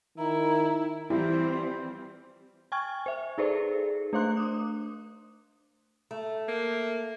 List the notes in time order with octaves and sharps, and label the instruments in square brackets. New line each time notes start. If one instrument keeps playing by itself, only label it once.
[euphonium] D#3 [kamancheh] E4 [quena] A#5
[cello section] E3 C4 [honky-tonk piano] G3 [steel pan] E4 [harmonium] F4 C5
[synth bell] G5 G#5 C#6 F6 G#6
C5 E5
D#4 G#4 A4 B4 C5 D5
A3 D4 C5 F5 C6 F#6
D6 D#6
[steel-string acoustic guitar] A3
[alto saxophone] A#3